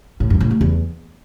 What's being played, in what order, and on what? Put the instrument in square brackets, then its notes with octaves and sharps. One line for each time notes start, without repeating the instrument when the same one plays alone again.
[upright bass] A2
F#2
A2
A3
E2